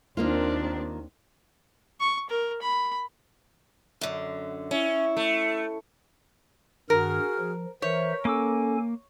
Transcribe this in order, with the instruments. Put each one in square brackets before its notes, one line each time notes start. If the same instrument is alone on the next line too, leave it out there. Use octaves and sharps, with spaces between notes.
[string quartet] D#2 C4 D4 [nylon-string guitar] D#3 A#3 F4
[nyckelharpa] C#6
A#4
B5
[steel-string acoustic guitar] F#2 D3
[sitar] C#4 [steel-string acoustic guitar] E4
[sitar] A3
[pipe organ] G2 D#3 [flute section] F#4 G#4 F6 [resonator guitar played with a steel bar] A#4
[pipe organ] F3
[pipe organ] E3 C5 E5 [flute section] A#4 [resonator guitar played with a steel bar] C#5
[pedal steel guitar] A#3 D6 E6 [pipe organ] C#4 A4 G#5